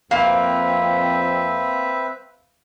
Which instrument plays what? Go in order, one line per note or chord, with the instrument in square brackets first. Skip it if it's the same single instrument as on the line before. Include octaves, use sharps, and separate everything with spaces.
[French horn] F2 [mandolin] A#3 [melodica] C4 B4 E5 [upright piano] F5